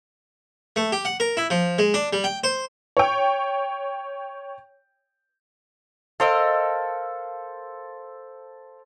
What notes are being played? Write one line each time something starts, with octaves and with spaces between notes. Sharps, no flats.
A3
G4
F#5
A#4
E4
F3
G#3
D4
G3
G5
C5
C#5 G5
A4 A#4 C5 D#5 F5 E6